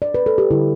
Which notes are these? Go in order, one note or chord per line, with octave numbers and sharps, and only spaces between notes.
D5
B4
A4
G4
D3 G3 E4